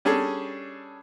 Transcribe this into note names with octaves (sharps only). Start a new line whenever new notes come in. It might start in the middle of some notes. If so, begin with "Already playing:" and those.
G3 C#4 D4 G#4 A4